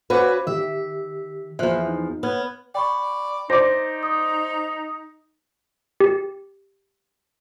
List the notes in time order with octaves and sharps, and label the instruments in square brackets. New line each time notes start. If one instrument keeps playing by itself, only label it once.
[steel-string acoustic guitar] C#4 F#4 B4 [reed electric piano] C5 F5 D6
[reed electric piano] D#3 G4 [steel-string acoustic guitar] E5
[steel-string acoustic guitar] E2 F3 [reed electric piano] E5 F#6
[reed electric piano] D#4
[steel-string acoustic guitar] B3 [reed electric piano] C#5 F6 G#6
[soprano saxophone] D5 [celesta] G5 B5 C#6
[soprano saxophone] D#4 [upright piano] C5 D5 D6 [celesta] A#6
[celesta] D#6
[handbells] G4